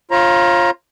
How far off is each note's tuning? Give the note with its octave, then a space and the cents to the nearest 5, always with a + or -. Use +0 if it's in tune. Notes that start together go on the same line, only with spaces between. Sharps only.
F4 +0 C#5 -40 A#5 +20